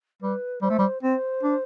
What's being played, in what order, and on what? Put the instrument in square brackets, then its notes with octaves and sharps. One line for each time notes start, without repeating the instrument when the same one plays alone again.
[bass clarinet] G3 [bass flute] B4
[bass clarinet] G3 [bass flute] C5
[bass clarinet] A3
G3
[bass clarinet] C4 [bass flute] C5
[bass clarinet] D4